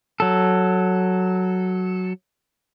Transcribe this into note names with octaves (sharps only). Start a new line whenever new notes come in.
F#3 A4